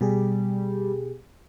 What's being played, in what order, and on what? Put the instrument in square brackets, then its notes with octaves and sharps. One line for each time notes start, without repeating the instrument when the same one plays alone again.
[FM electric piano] B2 G4 G#4 [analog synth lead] G3